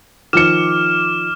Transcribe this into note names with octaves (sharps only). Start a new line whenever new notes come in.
D#3 F3 D6 F6 C#7 E7